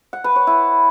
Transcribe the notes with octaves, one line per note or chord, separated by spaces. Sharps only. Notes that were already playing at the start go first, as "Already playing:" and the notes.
F#5
B4
C#5
E4